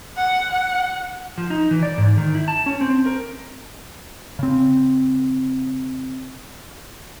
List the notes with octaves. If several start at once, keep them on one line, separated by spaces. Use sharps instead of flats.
F#5
F#5
F3
D#4
E3
D5
G#2
D#3
E4
A5
C#4
C4
A#4
C#3 C4